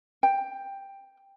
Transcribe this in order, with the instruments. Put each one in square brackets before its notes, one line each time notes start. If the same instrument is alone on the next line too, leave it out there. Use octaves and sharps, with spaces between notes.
[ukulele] G5